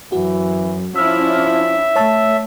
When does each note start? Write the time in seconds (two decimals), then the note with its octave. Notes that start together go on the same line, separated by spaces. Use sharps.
0.12 F#2 E3 F#4
0.96 F3 C#4 D4 E4 E5 E6 F6
1.96 A3 C#5 A5 E6